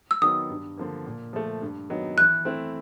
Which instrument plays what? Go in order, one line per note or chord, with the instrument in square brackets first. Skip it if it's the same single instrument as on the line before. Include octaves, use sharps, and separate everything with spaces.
[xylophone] E6
[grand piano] D#3 F#3 B3 [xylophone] D#6
[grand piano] G2
D3 F3 A#3
A#2
F3 A3
G2
D#3 F#3 B3 D#4
[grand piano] E3 [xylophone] F#6
[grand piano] A3 C4 E4